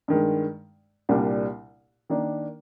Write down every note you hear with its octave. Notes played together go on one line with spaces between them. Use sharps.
G2 D#3 G#3
C2 A#2 G3 D4
D#3 A#3 D4